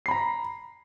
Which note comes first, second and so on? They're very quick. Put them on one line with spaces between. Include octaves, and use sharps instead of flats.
C7 B5 A#5